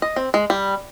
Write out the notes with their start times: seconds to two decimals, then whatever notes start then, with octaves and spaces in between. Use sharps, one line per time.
0.02 D#5
0.16 C4
0.34 G#3
0.50 G3